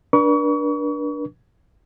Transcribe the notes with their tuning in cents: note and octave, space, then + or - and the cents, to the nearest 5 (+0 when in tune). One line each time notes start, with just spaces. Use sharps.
D4 +0 B4 -45 C#6 +35